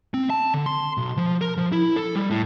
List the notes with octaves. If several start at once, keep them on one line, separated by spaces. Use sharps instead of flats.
C4
A5
D3
C6
B1
F3
A#4
F3
E4
A4
G3
A2